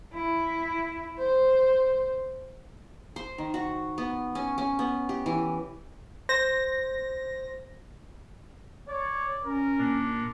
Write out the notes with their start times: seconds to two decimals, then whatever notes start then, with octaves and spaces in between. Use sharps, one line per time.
0.14 E4
1.19 C5
3.16 C5
3.38 D#3
3.54 F#4
3.98 B3
4.35 C#4
4.58 C#4
4.79 B3
5.09 G4
5.26 E3
6.29 C5 A#6
8.89 C#5 D5
9.44 C#4 A#4
9.80 A#2 D4